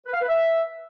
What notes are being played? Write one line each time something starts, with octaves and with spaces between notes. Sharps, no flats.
B4
F5
B4
E5